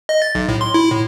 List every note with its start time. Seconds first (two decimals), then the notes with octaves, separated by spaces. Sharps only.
0.09 D#5
0.22 A6
0.35 B1
0.48 A2
0.61 C6
0.74 E4
0.91 A2